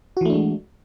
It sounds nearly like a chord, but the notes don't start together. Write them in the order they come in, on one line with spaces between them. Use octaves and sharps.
F#4 E3 A3 D4 G#3